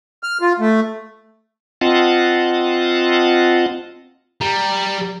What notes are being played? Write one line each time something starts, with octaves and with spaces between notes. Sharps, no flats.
F6
F4
A3
C4 F4 D#5 F#5 A5
G3 A#5